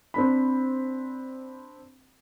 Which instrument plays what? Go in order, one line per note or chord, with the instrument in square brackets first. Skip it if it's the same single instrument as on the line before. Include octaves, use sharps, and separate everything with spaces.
[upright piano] C4 D4 B5